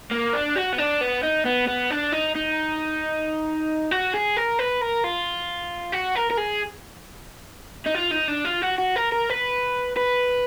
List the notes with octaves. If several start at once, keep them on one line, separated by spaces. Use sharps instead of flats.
A#3
D4
F#4
B3
D4
B3
D#4
B3
B3
D4
D#4
D#4
F#4
G#4
A#4
B4
A#4
F4
F#4
A#4
A#4
G#4
D#4
F4
D#4
D4
F4
F#4
F#4
A#4
A#4
B4
B4